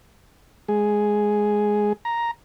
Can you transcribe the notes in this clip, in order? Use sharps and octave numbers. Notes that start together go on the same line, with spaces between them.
G#3 G#4
A#5